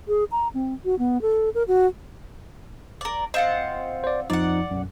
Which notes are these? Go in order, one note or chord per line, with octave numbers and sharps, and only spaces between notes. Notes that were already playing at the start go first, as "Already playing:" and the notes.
G#4
A#5
C4
F#4
B3
A4
A#4
F#4
A#4 D5
C4 F4 D#5 F#5
C5 D5
F2 F3 D#4 D5 F#5
B1 F#2